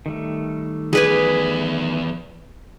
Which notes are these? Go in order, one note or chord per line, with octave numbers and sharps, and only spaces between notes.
D#3 G3 A3
E2 G#4 B4 D5 G#5